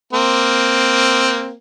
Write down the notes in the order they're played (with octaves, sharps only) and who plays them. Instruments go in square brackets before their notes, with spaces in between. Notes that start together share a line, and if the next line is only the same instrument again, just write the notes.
[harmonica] A#3 C4